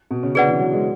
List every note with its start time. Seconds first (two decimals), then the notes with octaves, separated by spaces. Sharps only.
0.11 B2
0.23 C#3
0.35 D3 G#4 B4 D5 F#5
0.48 E3
0.60 F#3
0.73 G#3